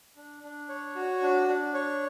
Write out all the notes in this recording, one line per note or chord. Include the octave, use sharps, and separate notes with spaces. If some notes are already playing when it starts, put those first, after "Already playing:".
D4
D4
C#5
F#4
D4
D4
C#5